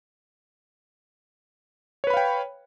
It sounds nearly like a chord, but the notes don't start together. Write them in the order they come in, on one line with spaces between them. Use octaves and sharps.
C#5 B4 B5 F5 G5